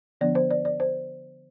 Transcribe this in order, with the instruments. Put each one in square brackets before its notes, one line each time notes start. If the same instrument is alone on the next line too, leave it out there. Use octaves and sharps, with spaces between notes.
[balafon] D3 F3 B3 D4 D5
C5
D5
D5
C5